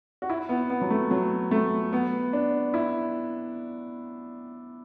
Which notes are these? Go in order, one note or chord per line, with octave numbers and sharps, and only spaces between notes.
F#4
E4
B3
B3
F#3
A3
F#3
A3
B3
D4
E4